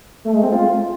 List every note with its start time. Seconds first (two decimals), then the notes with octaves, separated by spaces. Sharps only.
0.25 A3
0.34 G#3
0.43 C4
0.52 F4